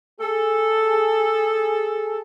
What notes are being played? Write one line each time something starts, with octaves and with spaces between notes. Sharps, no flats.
G#4 A4